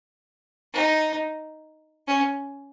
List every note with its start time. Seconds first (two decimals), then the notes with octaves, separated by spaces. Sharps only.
0.73 D#4
2.07 C#4